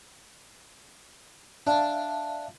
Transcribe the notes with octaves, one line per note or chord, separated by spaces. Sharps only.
D4 E5 F5 A5